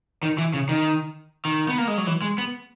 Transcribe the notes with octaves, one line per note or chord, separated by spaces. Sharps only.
D#3
E3
C#3
D#3
D#3
B3
A#3
G#3
F#3
E3
G#3
B3